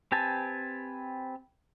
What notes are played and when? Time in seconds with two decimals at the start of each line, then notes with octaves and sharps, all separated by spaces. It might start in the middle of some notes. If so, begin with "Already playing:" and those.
0.12 C4 G4 B4 G#5 A5